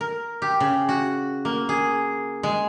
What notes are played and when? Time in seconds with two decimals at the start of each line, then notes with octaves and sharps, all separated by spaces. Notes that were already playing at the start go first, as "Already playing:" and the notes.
0.01 A#4
0.42 G4
0.60 C#3
0.89 F#4
1.45 A#3
1.69 G#4
2.43 G#3